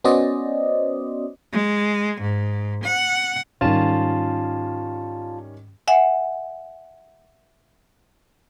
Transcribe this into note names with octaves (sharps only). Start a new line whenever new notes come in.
B3 C#4 F#4 C5 D5 D#5
G#3
G#2
F#5
G#2 D#3 G3 A3 C#4 F4 A5
E5 F#5 G#5